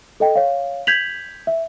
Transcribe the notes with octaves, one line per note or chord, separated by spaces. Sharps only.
A4 D#5 G5
C#5 F5
G6 G#6 B6 F7 F#7
E5